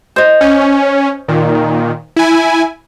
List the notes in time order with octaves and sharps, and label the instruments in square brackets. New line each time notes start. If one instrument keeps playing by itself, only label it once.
[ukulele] C5 D#5
[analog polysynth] C#4
A#2 D#3
E4 G#5